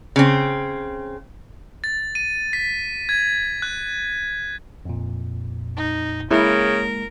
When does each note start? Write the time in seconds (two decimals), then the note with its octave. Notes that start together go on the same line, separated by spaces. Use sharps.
0.16 C#3 C4
1.84 A6
2.15 D#7
2.53 B6
3.09 G#6
3.62 F#6
4.85 F2 A#2
5.77 D#4
6.31 C#3 G#3 A#3 E4 A#4